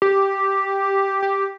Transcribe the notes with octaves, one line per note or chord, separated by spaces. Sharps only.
G4
G4